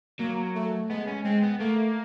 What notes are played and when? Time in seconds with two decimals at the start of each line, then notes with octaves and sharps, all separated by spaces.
0.19 F#3 A#3
0.55 A3
0.90 G#3 B3
1.07 C#4
1.24 G#3 C4
1.42 B3
1.60 A3 A#3